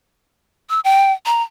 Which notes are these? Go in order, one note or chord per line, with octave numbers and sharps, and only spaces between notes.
E6
G5
A#5